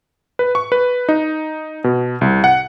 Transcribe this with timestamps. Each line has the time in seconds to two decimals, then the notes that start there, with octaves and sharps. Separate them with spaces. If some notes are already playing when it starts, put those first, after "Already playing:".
0.39 B4
0.55 C#6
0.72 B4
1.09 D#4
1.84 B2
2.21 C2
2.44 F#5